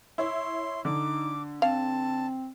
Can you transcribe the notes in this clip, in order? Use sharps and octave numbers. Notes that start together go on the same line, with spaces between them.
E4 C#5 C6
D3 D#4 D6
C4 F5 A5